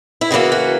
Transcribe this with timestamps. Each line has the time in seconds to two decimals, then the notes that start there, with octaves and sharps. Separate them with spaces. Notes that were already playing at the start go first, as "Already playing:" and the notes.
0.21 E4
0.31 C#3 E3 A#3 F#4
0.52 F#4